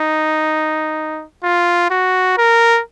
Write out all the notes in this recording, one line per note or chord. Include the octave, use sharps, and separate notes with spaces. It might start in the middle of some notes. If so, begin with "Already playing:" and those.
Already playing: D#4
F4
F#4
A#4